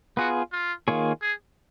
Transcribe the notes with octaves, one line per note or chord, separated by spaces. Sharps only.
B3 F4 F#4 G#4
F4
D#3 A#3 F4 G#4 C#5
G#4